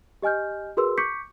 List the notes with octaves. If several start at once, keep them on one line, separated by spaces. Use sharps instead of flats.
G4 D#5 G#5 F6 G6
F#4 G#4 A#4 B4 C6 E6
C#6 D6 G6 B6 C#7